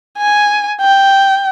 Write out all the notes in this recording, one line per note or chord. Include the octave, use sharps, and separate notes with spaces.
G#5
G5